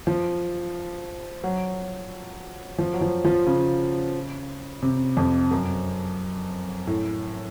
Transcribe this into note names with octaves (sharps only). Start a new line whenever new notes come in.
F3
F#3
F3
F#3
F3
F3
C#3
C3
F2
F#2
A2